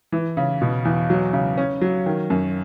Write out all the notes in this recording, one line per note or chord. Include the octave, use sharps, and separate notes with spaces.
E3
C#3
B2
E2
F#3
C#3
C#4
F#3
D#3
F#2